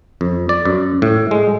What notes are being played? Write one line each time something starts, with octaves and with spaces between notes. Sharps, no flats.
F2
D5
F#2
A2
G#3